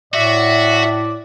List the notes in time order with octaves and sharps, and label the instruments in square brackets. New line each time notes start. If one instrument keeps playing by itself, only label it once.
[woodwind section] A2 [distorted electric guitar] F#4 [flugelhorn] D5 [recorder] E5